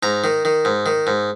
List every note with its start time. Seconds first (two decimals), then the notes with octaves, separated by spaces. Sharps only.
0.03 G#2 A#5
0.24 D#3
0.45 D#3
0.65 G#2
0.86 D#3
1.07 G#2